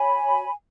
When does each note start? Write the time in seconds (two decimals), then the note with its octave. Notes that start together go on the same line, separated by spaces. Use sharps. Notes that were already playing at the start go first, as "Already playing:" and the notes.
Already playing: F#4 C#5 G#5 B5